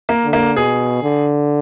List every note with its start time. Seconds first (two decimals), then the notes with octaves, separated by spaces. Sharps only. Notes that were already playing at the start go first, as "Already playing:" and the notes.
0.09 A#3
0.25 D3
0.33 A#3
0.56 B2 G#4
1.03 D3